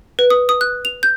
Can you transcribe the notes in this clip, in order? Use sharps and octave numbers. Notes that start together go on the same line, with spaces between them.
B4
D#6
D#6
F#6
F7
G6